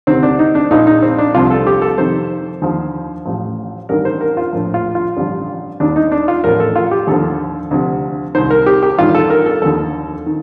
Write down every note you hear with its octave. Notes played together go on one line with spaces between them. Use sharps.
D2 C3 D#3 C4
D4
D#4
D4
A#1 A#2 F3 D#4
D#4
C4
D4
C2 C3 F3 F4
A4
G4
A4
F2 C3 D#3 C5
D#2 D3 F3
A1 A2 F3
A1 G2 D#3 A#4
C5
A#4
F4
A#1 A2 F3
F4
F4
A1 G2 D3 F3
D#2 D#3 D4
D#4
D4
F4
A1 A2 F3 A#4
A4
F4
G4
D#2 D3 F3 A4
D2 C3 F3
C2 C3 D#3 C5
A#4
G4
G4
A1 G2 D#3 F4
A4
A#4
A4
D#2 D3 F3 A4
D#3